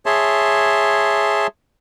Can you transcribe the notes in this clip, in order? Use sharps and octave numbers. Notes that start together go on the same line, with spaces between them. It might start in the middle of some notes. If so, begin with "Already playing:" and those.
G#4 C#5 E5 A5 C6